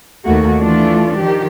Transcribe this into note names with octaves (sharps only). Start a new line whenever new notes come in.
D#2 A3 A#3 F#4
E3 A3 D4 F4
D#3 F3 G4